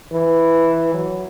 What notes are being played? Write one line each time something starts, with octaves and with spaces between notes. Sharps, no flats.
E3
F#3